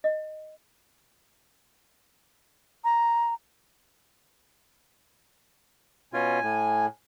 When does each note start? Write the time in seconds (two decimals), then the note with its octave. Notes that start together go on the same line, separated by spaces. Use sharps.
0.04 D#5
2.84 A#5
6.13 B2 C#4 F4 G#5
6.43 A2